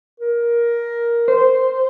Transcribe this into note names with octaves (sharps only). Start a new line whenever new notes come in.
A#4
C5